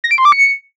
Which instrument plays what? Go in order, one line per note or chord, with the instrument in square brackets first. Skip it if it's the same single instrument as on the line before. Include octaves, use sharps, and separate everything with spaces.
[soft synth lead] A#6
D7
C6
D6
C#7